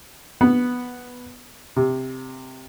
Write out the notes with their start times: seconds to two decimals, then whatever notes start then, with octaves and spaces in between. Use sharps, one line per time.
0.41 B3
1.76 C3